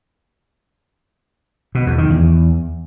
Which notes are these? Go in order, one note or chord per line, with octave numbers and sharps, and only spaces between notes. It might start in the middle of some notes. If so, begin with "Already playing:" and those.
B2
E2
D#3
E2